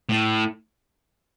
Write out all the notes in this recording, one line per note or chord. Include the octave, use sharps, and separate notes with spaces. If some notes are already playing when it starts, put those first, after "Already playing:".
A2